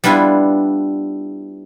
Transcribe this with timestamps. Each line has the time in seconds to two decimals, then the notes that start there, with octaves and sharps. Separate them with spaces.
0.04 G3 B3 D4 E4 F4